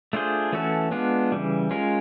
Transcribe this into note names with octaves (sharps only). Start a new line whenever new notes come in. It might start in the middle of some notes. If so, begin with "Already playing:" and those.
A3 D4 F4 G#4 C5
E3 A3 C#4 F#4 A4
G#3 B3 D4 F4
C#3 E3 G3
G#3 C#4 F4 A#4